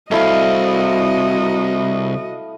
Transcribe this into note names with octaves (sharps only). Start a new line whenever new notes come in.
C2 A3 E4 F#4 D#5 F5